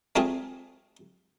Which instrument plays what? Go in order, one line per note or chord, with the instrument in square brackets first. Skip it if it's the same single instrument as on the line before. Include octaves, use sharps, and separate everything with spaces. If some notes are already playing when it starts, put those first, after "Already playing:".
[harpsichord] A3 C4 F4 G#4